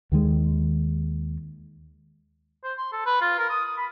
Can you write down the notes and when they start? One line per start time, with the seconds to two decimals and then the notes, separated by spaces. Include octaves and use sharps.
0.12 D#2 D#3 G#3
2.64 C5
2.78 C6
2.93 A4
3.06 B4
3.21 F4
3.39 A#4
3.50 D#6
3.65 D#6
3.77 B5